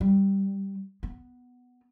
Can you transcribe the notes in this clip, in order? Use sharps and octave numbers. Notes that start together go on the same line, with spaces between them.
G3
B3